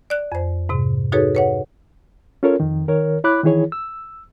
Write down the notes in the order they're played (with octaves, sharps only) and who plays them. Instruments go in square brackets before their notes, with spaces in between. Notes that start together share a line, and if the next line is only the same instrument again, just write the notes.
[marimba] D5 F#6
F2 C5
G#2 C3
D#4 F#4 G#4 A4 B4 C#5
B4 C#5 F#5
[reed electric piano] C#4 F4 A4 A#4 C#5
F2 D#3
D#3 A#4 C#5
E4 C#5 B5 D6 F#6
D#3 E3 E4 G#4 C#5
E6